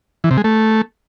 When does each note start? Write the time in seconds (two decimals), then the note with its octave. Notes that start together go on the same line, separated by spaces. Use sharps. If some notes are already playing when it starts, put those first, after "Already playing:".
0.24 E3
0.31 C3
0.38 G#3
0.44 A3